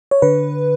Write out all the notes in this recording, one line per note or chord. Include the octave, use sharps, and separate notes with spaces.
C#5
D3 B4